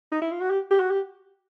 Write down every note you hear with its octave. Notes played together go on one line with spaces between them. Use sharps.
D#4
E4
F4
F#4
G4
G4
F#4
G4